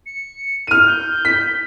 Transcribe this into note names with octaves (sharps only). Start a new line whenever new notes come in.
C#7
F6 D#7
G6
B6